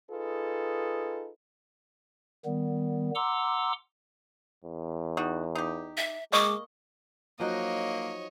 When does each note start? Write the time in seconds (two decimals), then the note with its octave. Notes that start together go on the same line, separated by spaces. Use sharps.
0.10 D#4 F4 G#4 A4 B4
2.45 D#3 G3 B3
3.15 F#5 A#5 C6 D6 E6
4.64 E2
5.17 G3 D#4 F#4
5.55 D#4 G4
5.97 E5
6.32 G#3 A#3 D#5 C#6 D6
7.40 F3 F#3 A#3 D#4 C#5 D#5